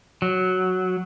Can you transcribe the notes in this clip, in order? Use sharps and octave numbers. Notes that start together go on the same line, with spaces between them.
F#3